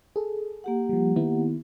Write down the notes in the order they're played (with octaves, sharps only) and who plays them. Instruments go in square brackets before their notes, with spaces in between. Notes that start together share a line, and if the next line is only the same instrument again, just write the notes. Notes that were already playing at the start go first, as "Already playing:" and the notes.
[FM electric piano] G#4 A4
[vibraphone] A#3 G4 F#5
[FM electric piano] F3 G3
D#3 B3 E4